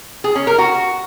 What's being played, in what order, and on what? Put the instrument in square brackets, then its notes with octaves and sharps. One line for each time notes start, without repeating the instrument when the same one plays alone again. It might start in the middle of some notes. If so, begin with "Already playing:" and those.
[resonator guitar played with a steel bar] G#4
C#4
A#4
F#4